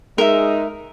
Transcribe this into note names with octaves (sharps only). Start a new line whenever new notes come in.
G#3 D#4 A#4 E5